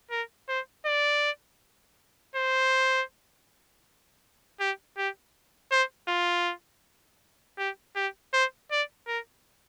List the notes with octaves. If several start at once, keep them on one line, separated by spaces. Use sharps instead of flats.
A#4
C5
D5
C5
G4
G4
C5
F4
G4
G4
C5
D5
A#4